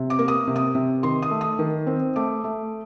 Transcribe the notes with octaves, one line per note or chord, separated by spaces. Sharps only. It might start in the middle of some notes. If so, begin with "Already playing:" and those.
Already playing: C3
D6
A#3
D#6
C3
D#6
C3
D#3 C6
D#6
A3
D#6
D#3
C4
A3 D6
A3